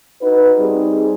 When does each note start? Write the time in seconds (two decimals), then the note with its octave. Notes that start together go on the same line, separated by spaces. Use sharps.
0.22 D#4 F#4 B4
0.57 G3 C4 D#4 G#4